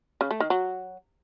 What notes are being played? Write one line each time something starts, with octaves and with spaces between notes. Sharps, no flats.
C#3
A3
D#3
F#3